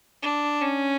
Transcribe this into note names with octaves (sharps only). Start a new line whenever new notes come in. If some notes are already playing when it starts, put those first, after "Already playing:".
D4
C#4